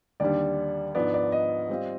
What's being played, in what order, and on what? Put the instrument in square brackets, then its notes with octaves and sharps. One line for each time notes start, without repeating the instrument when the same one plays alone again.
[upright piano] D#2 D3 G3 [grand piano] D5
[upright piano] G#2 F3 B3 D4 [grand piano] D5
[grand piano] D5
D#5
[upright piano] G3 C4 F4